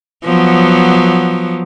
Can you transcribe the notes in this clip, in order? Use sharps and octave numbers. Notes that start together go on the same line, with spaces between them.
F3 F#3 B3